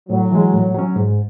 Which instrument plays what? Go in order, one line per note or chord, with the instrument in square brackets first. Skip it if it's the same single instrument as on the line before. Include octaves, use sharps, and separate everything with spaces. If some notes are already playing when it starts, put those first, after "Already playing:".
[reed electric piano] A2 [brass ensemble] F#3
[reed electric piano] E3 G#3
A2
F#3 C#4
G#2